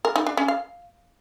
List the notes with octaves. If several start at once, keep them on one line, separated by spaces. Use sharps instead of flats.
A#4
D#4
D4
C#4
F5